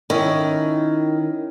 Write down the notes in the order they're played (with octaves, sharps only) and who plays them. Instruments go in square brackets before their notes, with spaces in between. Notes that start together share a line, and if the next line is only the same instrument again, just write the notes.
[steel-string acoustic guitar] D#3 [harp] C#4 E4 C#5